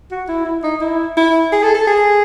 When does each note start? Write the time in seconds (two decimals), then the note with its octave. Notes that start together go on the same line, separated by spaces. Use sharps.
0.11 F#4
0.28 E4
0.45 E4
0.63 D#4
0.81 E4
1.17 E4
1.52 G#4
1.63 A4
1.75 A4
1.87 G#4